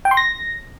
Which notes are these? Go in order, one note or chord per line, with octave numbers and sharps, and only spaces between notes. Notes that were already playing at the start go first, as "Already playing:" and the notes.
G5
C6
A#6